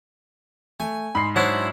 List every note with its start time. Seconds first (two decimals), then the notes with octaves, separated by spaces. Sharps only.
0.80 A3 G#5
1.15 G#2 B5 C6 C7
1.36 F#3 D4 E4 C5 C#5 F#5